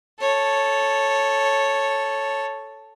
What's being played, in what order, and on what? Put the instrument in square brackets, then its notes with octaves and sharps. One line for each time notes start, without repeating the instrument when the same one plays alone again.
[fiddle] A4 C#5